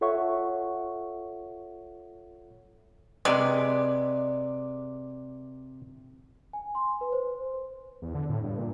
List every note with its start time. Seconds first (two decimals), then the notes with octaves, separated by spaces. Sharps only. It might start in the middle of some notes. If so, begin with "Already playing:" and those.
0.01 F4 A4 C#5 E5 F#5 C#6
3.25 C3 G#3 B4 D5
6.53 G#5
6.75 C6
7.01 B4
7.12 C5
8.02 E2
8.15 D3
8.29 A2
8.43 G2
8.58 A#2